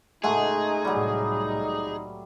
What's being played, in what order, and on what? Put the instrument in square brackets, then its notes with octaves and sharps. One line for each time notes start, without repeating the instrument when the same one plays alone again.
[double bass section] A2 C#3 [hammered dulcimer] G#3 A3 F#4 [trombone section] D#4 [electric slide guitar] G#4
[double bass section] C2 A2 [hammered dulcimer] F#3 G3